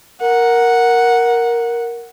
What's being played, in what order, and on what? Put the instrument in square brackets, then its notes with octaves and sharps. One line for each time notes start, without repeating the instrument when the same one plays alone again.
[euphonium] A#4 [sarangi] F#5